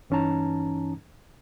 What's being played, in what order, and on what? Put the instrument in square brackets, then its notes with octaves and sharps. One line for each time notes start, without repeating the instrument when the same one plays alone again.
[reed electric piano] G2 E3 C#4 D#4 A5 A#5